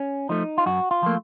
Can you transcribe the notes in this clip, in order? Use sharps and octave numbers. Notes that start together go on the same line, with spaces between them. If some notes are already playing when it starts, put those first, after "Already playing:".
Already playing: C#4
F3 A3 D#4
F4
F#2 F#4
F4
F3 A3 A#3